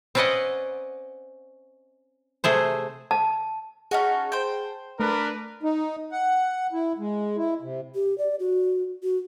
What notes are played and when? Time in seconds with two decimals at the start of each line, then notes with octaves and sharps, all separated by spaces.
0.15 C4 C#4 B4 D5 D#5 F#5
2.44 C3 A3 G#4 C5
3.11 A5
3.91 C#4 D#4 F#4 G#4 A5
4.32 C5 G5
5.00 A3 D4 A#4 B4
5.63 D#4
6.12 F#5
6.72 E4
6.98 G#3
7.37 E4
7.62 C3
7.95 G4
8.18 D5
8.40 F#4
9.03 F#4